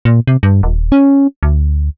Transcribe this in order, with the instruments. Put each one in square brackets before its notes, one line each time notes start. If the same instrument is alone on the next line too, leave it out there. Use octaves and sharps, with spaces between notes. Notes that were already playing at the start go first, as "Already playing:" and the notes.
[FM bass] A#2
C3
G2
D#1
C#4
D2